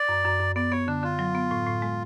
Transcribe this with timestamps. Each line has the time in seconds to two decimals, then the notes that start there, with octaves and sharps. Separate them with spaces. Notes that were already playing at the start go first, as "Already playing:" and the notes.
Already playing: D5
0.09 F#2
0.24 F#2
0.40 F#2
0.56 B3 D5
0.72 B3 C#5
0.87 D3 D4
1.03 D3 F4
1.19 F#3
1.35 B3
1.51 A2
1.67 A2
1.82 G#3